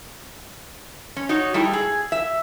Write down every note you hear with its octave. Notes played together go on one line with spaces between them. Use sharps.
C#4
D#4 F#4 C#5
G3 A3 D#4 E4
G#4
E5